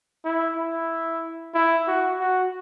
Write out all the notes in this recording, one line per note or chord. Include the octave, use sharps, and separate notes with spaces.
E4
E4
E4
F#4
F#4